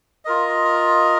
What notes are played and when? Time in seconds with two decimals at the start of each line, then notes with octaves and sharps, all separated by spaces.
0.25 F4 A#4 D#5